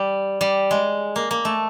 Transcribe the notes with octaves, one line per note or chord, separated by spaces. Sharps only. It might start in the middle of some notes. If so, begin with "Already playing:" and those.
Already playing: G3
G3
G#3
A#3
A#3
A3